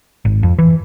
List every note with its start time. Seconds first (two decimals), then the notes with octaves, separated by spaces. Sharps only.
0.25 G#1
0.43 F2
0.59 E3